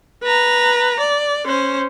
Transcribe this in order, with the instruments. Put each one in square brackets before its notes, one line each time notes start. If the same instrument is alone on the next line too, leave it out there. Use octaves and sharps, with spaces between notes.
[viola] B4 A#5
D5
C#4 C5